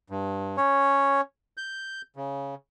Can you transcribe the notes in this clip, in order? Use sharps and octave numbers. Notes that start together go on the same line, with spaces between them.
G2
C#4 C#5
G6
C#3